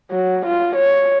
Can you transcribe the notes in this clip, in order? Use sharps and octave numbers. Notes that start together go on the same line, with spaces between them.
F#3
F4
C#5